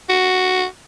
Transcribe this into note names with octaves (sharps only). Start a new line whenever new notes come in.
F#4